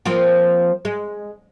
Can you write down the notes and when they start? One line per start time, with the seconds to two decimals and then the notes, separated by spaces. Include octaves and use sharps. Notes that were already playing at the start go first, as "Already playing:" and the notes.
0.05 F3 A#3 C4
0.85 G#3